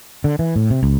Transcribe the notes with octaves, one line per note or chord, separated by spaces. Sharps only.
D3
E3
A2
C3
C#2